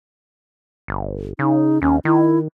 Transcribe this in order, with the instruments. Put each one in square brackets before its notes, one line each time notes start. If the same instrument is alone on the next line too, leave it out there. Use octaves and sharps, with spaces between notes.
[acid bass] G1
[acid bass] C#3 [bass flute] D#4
[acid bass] D#2 [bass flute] C#4
[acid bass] D#3 [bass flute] E4